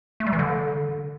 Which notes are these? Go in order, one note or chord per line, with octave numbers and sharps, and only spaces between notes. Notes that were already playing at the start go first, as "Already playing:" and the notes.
A3
G3
E3
D3